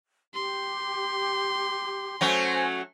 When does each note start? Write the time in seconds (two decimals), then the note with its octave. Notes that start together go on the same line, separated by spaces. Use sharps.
0.34 G4 C6
2.21 F#3 A3 C#4 C5 G#5